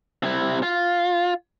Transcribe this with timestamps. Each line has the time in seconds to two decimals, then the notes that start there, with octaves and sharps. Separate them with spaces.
0.23 C3 E4
0.63 F4